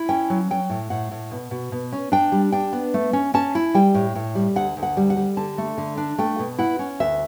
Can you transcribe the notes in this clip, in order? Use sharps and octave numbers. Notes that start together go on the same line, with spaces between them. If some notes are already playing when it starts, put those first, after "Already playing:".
Already playing: E4
C#4 G5
F#3
F#3 G5
A2
A2 F#5
A2
B2
B2
B2
C#4
D4 G5
G3
D4 G5
B3
A3
C#4
C#4 A5
E4
G3 G5
A2
A2
G3
D2 F#5
D2
F#5
G3
F#5
G3
D3 A5
A3
D3
D4
A3 G5
B2
E4 F#5
C#4
D2 E5